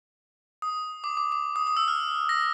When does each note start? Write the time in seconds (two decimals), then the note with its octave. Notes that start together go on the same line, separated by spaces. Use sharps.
0.62 D#6
1.04 D6
1.17 D6
1.32 D6
1.56 D#6
1.67 D#6
1.77 E6
1.88 F6
2.29 A#6